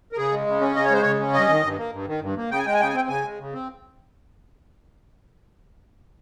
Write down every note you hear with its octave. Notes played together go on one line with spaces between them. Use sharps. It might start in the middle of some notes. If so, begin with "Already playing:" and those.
A#4
C#3 G#4
G#3
C#3
C#4
C#3 D#5
C#5
G#3 C5
C#3 C#5
C#4
G2 D#5
D#3
G2
A#3
G2
D#3
G2
A#3
C#3 G5
G#5
G#3 G5
G#5
C#3 G5
G#5
C4 G5
C#3 G#5
G#3
C#3
C4